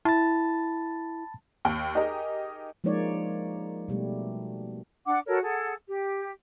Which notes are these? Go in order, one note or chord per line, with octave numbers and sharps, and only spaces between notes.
E4 A5 B5 A6
D#2 G5
D#4 G4 G#4 A#4 D#5
F3 G#3 A#3 D#4 C#5 D5
B2 G3 A3
D4 F#5 D6
F#4 A4 A#4 C#5
G#4 A4 F#5
G4